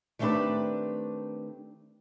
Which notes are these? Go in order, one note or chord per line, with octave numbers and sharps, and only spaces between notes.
D#3 A3 C4 D4 G4 B4